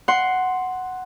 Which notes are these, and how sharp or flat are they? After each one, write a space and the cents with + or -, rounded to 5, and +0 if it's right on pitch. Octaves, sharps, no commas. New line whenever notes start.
F#5 +0 C6 +0